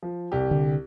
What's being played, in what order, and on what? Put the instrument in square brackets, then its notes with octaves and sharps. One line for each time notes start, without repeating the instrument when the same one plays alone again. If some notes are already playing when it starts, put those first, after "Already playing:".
[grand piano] F3
C2 G4
[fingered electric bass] D3